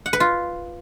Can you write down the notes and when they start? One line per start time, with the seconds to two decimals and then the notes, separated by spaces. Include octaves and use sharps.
0.06 F#5
0.13 B4
0.20 F4